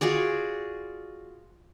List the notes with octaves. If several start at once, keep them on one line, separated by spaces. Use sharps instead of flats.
F4 F#4 G#4 D5